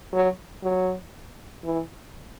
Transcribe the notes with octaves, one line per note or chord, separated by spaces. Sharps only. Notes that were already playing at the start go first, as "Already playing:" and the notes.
F#3
F#3
E3